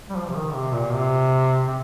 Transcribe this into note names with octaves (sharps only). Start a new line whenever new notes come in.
G3
F3
C3
D#3
C3
A#2
C3
C3